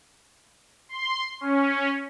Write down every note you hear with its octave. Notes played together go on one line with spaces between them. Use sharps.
C6
C#4